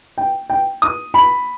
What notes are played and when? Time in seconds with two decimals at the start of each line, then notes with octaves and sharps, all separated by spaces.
0.18 G5
0.50 G5
0.82 D#6
1.14 B5